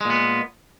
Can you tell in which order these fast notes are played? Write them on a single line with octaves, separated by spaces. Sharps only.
G#3 A#2 B3